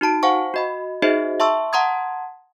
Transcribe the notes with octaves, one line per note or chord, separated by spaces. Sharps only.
D#4 F#4 A5 D7
C5 F5 F#5 G#5 C#6
F#4 D#5 B5
D#4 F#4 G#4 C5 D#5 E5
E5 A5 C6 C#6 E6
F#5 A5 A#5 C6 D#6 G#6